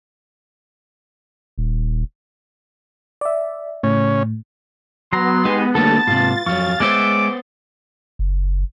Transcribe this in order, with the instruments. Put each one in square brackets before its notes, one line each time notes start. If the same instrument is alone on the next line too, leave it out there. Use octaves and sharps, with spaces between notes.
[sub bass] D#1
[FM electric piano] D5 E5
[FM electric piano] A2 [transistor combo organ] C#3 C#4
[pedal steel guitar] F#3 A#5 [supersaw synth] B3 [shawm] C6
[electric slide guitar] G#3 [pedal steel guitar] D#4 G4 G#5
[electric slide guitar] D3 A#3 [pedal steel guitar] G3 A3 A4 [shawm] A5 [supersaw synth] A6
[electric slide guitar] G#2 C3 [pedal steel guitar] F4
[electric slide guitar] F2 F#3 [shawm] F5 [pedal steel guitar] C#6
[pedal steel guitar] G#3 C#5 E5 [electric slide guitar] B3 E4 C5 [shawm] D6
[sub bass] F#1